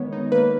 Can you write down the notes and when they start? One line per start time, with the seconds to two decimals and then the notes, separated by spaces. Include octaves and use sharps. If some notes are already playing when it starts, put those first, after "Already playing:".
Already playing: D#3 G#3 B3 C#5
0.12 D#4
0.32 A#3 B4